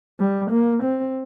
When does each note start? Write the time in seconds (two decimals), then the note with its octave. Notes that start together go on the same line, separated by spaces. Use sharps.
0.20 G3
0.51 A#3
0.83 C4